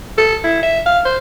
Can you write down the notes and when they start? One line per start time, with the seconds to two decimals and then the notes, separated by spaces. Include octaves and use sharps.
0.18 A4
0.44 E4
0.63 E5
0.86 F5
1.05 C5